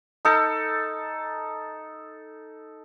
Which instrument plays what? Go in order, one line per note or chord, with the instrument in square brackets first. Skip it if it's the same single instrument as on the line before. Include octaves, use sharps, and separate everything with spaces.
[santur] D#4 A4